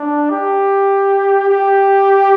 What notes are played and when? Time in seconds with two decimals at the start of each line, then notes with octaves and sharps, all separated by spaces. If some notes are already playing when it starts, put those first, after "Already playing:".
Already playing: D4
0.30 G4
1.48 G4